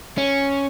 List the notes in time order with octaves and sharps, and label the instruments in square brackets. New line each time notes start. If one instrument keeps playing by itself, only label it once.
[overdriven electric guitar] C#4